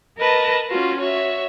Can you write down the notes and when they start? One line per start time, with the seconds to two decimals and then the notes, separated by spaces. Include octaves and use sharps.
0.17 A#4 B4 D#5 A5
0.68 C#4 F4 F#4
0.98 F#4 C#5 E5